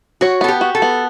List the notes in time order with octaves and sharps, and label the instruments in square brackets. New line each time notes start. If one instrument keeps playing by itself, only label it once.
[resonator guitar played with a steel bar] F#4 [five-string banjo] C#5
[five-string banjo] B3 [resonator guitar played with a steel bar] A4
[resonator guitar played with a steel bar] G4
[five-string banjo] F#4
[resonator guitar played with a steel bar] A4
[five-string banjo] B3